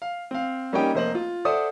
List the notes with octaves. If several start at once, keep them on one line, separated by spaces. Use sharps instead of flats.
F5
C4 F5
G3 A#3 C#4 D#4 G4 G5
F1 A#3 C5 D#5 F#7
F4
A4 C5 D5 E5 F#5 D#6